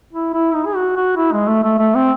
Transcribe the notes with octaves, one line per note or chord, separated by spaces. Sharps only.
E4
E4
D#4
G#4
F#4
F#4
E4
G#3
A3
A3
A3
C4